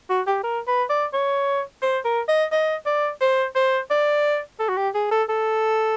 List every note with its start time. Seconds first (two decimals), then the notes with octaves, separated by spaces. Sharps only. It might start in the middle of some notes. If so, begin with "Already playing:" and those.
0.09 F#4
0.27 G4
0.43 A#4
0.67 B4
0.89 D5
1.13 C#5
1.82 C5
2.05 A#4
2.29 D#5
2.52 D#5
2.86 D5
3.21 C5
3.55 C5
3.91 D5
4.59 A4
4.68 F#4
4.77 G4
4.94 G#4
5.11 A4
5.29 A4